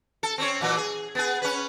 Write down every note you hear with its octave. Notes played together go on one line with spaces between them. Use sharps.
A4
C4 C#4 C#5
A#2 E3 F#3
G#4
B3 G#4
C#4 B4